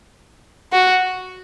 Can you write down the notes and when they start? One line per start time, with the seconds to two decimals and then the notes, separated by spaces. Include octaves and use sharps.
0.72 F#4